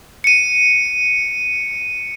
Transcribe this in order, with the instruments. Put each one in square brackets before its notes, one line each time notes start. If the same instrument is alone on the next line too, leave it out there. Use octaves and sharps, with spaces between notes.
[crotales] C#7 D#7